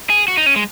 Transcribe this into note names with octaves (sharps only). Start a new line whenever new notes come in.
G#4
F#4
D#4
C#4
G#3